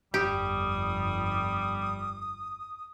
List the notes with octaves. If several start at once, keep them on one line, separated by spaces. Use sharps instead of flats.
G1 F2 G3 G4 D#6